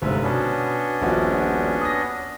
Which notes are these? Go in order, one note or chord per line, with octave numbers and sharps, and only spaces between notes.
G1 G#2 C3 B4
B2 B3 C#4 D4
D#1 A#1 F#4
D#6 A#6